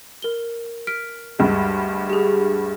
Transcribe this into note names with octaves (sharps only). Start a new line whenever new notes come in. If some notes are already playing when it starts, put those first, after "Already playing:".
A#4 G7
F6 B6 D7
D2 G2 G#3
G4 G#4